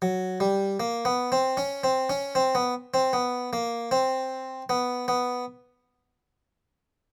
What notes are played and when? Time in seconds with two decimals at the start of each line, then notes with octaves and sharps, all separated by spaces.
0.02 F#3
0.40 G3
0.80 A#3
1.05 B3
1.32 C4
1.57 C#4
1.84 C4
2.10 C#4
2.35 C4
2.55 B3
2.94 C4
3.13 B3
3.53 A#3
3.91 C4
4.69 B3
5.08 B3